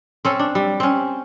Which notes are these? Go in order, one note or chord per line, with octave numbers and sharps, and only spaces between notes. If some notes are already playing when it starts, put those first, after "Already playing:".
C4 C#4 A4
D4
G3
C4 C#4